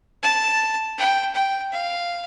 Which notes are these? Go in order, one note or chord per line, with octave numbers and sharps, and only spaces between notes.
A5
G5
G5
F5